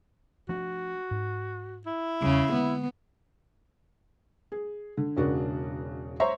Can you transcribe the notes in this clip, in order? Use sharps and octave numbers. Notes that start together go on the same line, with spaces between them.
F3 A3 D4 F#4
G#2
E4
E2 C#3 G3
D3 G#3 A#3 B3
G#4
D3
E1 C#3 D4 F#4 A#4
C5 C#5 E5 A#5 C6 C#6